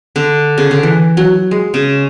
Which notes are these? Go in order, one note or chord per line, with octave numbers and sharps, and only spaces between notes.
D3
C#3
D3
E3
F#3
G#3
C#3